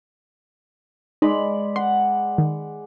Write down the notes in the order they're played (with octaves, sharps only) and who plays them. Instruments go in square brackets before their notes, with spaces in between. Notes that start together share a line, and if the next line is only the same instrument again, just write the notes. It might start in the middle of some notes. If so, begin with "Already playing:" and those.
[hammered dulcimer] G#3 D5 B5 [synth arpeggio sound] D#4
[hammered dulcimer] F#5 [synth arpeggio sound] C6
[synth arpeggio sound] D#3